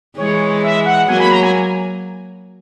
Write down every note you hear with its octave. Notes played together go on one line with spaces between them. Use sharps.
E3 G#3 C#5
E5
F#5
F#3 A#3 G#5
B5
A#5
G#5